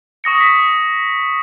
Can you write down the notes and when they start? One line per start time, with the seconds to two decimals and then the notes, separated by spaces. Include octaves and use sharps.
0.24 C#6 D#6 A#6 C#7
0.40 B6